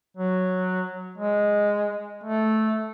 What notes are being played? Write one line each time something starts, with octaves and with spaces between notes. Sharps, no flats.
F#3
G#3
A3